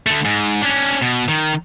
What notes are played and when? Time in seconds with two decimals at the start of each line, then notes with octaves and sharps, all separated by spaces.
0.06 D3 A3
0.25 G#2
0.61 C#4 D4
1.02 B2
1.29 D#3